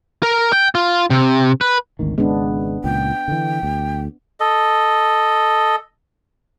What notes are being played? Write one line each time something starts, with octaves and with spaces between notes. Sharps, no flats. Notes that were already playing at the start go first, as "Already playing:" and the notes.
A#4
G5
F4
C3
B4
G#1 D2 D#3
G#1 C#3 G#3 B3 D4
C#2 A#2 G5
D3 E3
D2
A4 D#5